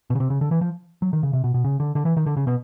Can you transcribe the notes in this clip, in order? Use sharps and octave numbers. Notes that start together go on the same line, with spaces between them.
B2
C#3
C3
C#3
D3
E3
F3
F#3
D#3
C#3
C3
B2
B2
C#3
D3
D3
E3
D#3
D3
C#3
B2